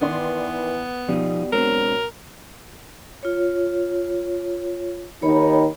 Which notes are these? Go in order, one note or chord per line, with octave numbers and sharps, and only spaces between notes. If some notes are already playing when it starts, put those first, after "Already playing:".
D#3 E3 B3 D5 C6
B2 F3 G3 D#4 F4
F#3 G#3 C4 D4 A#4
F4 C#5
D#2 D#3 D#4 C#5 B5